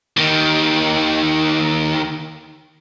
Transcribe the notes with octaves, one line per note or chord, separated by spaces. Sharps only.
D#2 D#3